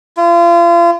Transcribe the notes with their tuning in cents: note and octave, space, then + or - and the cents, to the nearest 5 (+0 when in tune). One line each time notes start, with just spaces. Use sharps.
F4 -35